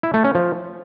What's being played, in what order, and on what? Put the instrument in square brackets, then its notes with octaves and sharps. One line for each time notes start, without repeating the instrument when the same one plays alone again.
[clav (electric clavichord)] E4
A3
C#4
F3